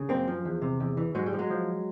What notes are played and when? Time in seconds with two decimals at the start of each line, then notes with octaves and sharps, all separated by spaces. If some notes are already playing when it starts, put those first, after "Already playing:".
Already playing: C#3
0.09 F#2 A#3 C4
0.28 F3
0.45 E2
0.62 C3
0.80 E2
0.97 E3
1.15 G#2 F#3 G#3
1.26 G3
1.33 F3
1.39 F#3 G#3
1.50 F3